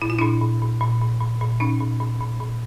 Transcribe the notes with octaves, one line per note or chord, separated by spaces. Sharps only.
A#2 E4
F4
A#2 D4 E4
A#2
A#2
A#2
A#2
A#2
A#2
A#2 C#4 D#4
A#2
A#2
A#2
A#2